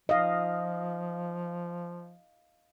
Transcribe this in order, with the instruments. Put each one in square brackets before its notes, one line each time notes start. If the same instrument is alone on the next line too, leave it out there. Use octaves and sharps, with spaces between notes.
[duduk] F3 [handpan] D#5 F5